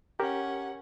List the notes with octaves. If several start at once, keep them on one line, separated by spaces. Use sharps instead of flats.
C#4 G4 A#4 F#5